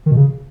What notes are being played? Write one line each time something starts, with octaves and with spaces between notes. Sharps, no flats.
D#3
B2
C#3